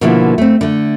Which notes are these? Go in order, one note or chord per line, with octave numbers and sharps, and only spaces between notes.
B2 D3 F3 A#3 E4
A3 C4
D3 A3